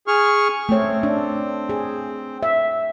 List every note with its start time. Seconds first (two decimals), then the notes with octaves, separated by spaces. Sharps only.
0.07 G#4 C#6 F6
0.69 A3 C4 C#5
1.03 D4
1.69 G#4
2.43 E5